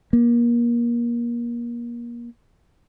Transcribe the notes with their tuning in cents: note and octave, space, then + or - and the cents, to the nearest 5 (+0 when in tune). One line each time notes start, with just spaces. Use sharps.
A#3 +30